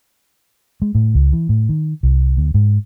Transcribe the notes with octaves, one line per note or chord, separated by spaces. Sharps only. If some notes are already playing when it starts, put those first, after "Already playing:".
G#3
A2
C#2
E3
A2
D#3
C2
D2
G#2